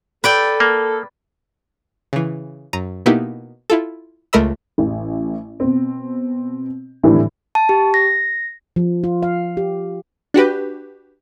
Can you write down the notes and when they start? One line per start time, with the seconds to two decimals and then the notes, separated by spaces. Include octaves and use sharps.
0.24 A4 B4 D5 G5
0.60 A#3
2.13 C#3 E3
2.73 F#2 A#5 D#7
3.06 B2 A#3 B3 D#4 E4 G4
3.70 E4 F4 A4
4.33 C#2 A3 A#4 D#5 B5 E6
4.78 A1
5.60 B2 C4
7.03 G#1 A2 D3 E3 G3
7.55 A5
7.69 G4
7.94 A#6
8.76 F3
9.04 F4
9.23 F5
9.57 G4
10.34 D4 F#4 G4 B4